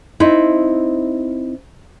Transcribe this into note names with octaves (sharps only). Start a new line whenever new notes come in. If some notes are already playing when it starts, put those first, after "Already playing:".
C4 D#4 E4